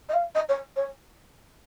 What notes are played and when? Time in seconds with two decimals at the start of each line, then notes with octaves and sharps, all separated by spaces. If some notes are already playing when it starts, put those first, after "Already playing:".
0.08 D#5
0.13 F5
0.34 D#5
0.48 C#5
0.76 C#5